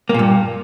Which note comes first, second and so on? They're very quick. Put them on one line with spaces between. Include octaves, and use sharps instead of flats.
A#3 A#2 G2